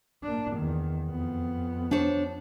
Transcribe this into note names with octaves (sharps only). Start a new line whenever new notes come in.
A#3 D4
E2 D#3
F2 B3
D4 C5 C#5